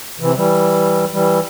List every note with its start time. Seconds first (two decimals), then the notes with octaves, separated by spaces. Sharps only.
0.20 C3 E3
0.36 E3 G3
1.12 E3 G3